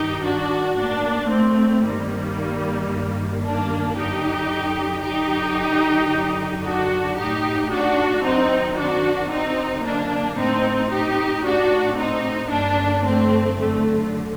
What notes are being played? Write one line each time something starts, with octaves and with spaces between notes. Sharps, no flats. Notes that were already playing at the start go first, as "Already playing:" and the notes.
Already playing: G2 D#3 D#4 G4
D4 F#4
A2 A#3 D4
A3 C4
G2 D#3 G3 A#3
G2 D#3
A#3 D4
F#2 D3 D#4 G4
F#2 D3 D#4 G4
F#2 D3
D4 F#4
A2 D#4 G4
D4 F#4
F#2 D#3 C4 D#4
D4 F#4
F#2 D3 C4 D#4
A#3 D4
A2 C4 D#4
D#4 G4
A2 D4 F#4
C4 D#4
G2 D3 A#3 D4
A3 C4
F#2 D3 A3